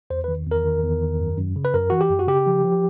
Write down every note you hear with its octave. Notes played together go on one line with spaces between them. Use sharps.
E2 C5
D#3 B4
E2 A#4
D#3
E2
D#3
F#2
F#2
C#3
B4
F#2 A#4
E3 F#4
G4
F#2
F#4
C#3 G4
F3
F3